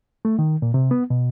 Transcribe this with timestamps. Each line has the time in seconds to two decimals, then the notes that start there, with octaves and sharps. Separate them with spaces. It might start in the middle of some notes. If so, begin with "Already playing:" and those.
0.25 A3
0.39 D#3
0.62 A#2
0.74 C3
0.91 B3
1.10 B2